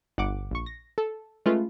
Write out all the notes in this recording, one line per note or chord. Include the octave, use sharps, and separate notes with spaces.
G1 F#5 D6
A#1 C#6
A#6
A4
G#3 A3 C#4 F4 B4